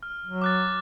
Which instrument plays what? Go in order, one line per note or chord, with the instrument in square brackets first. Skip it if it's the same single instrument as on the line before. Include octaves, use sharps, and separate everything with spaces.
[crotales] F6
[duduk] F#3
[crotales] D6 F#6 A6